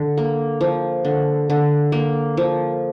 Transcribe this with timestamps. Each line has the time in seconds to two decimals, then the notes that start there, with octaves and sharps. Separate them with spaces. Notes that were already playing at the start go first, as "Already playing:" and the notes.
Already playing: D3
0.18 A#3
0.61 F3
1.05 D3
1.50 D3
1.92 A#3
2.37 F3